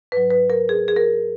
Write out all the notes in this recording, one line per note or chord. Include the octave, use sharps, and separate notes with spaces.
G#2 F#3 B4
B4
A#4
G#4
G#4
A#4